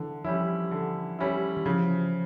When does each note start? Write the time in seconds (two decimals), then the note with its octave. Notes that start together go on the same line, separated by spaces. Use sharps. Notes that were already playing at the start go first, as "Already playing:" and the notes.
Already playing: D3 E3
0.25 F3 G3 C#4 E4
0.71 D3
1.19 G3 C#4 E4
1.57 E3
1.65 C#3 F3